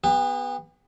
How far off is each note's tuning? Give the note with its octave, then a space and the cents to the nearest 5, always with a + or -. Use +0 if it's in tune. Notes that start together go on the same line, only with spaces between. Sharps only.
B3 +0 G4 +45